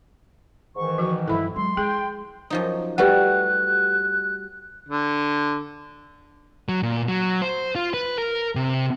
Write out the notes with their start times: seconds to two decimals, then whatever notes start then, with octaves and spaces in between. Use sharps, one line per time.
0.76 G#2 D#3 E3 C#6
0.98 F3 F#4
1.28 G2 C#3 E4 A4 B5
1.56 F#3 G#3 C6
1.77 G#3 G#4 G5
2.50 F#2 F3 D#4
2.98 G3 A3 F#4 G4 B4 F#5 F#6
4.89 D3
6.69 F#3
6.82 A#2
7.08 F#3
7.42 C5
7.75 F4
7.94 B4
8.18 A#4
8.55 C3